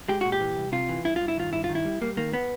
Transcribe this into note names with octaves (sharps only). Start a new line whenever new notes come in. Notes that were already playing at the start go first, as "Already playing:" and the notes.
G#3 G4
A#2 F#4
G4
E3
C2
C3 F4
E3
G2 E4
G2 F4
E4
D#3 F4
G2 E4
F4
D#3
E4
G3
G3 A#3
D#3 A#3
B3